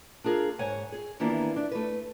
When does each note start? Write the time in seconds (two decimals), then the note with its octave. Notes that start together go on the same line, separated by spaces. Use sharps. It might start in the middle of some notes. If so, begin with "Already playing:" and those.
0.24 D4 F4 G#4 A#4
0.59 G#2 C#5 F#5 G#5
0.92 G#4
1.20 D#3 E3 A#3 B3 D4 E4
1.56 D4
1.72 A3 B4